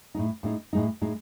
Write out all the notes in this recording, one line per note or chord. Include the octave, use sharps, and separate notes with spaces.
A2 G#3 D#4
A2 G#3 D#4
A2 G#3 D#4
A2 G#3 D#4